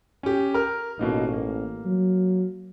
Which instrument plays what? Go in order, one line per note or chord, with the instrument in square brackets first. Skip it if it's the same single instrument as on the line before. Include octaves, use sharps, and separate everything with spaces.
[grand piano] C#4 G4
A#4 F6
[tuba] A1 [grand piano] B2 A#3 D#4
[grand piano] A#3
[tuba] F#3